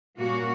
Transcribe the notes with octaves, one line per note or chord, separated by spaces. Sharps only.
A#2 G3 A#3 C#4 F#4